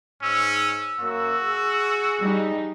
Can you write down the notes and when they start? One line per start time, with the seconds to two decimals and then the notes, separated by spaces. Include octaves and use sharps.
0.22 G#2 C#4 E6
0.99 F#2 A#3 F#4
1.43 G#4
2.21 G3 D#4